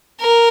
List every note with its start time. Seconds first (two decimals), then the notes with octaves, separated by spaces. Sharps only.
0.20 A#4